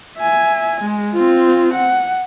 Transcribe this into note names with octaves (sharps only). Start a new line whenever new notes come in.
E5 G#5
G#3
C4 F4
F#5